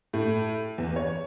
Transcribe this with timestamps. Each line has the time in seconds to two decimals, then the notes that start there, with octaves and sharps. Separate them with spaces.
0.13 A2
0.78 E2
0.96 C#5